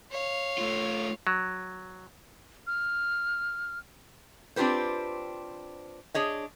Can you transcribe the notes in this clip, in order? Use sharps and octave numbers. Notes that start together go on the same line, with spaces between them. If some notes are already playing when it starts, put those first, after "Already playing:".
C#5 F5
A3 F4
F#3
F6
C4 D4 F4 G4 B4 C5
D4 G#4 C#5 D#5